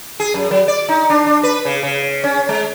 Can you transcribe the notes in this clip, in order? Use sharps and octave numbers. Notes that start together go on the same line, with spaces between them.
G#4
F#2
F#3
D5
D#4
D4
D4
B4
C#3
C#3
C#4
G#3